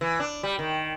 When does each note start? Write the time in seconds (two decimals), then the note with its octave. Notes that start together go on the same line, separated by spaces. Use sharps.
0.01 E3
0.20 D4
0.43 G3
0.59 D#3